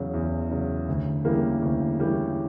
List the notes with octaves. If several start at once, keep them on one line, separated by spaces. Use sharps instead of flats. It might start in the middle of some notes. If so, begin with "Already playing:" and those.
Already playing: E2 C#3 F#3
E2
C#3 F#3
D2
C#3 E3 G3 A#3
D2
C#3 E3 G3 A#3